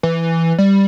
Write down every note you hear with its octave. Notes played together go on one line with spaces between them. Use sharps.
E3
G3